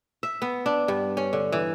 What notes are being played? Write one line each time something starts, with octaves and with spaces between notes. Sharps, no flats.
E5
B3
D4
G2
C#4
D3
E3